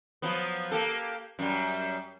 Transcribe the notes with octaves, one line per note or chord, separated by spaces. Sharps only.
F3 F#3 B3
A#3 G4 A4
F#2 G3